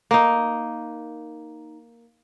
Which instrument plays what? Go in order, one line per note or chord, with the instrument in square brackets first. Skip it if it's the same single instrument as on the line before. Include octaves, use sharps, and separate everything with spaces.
[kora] A#3 D#4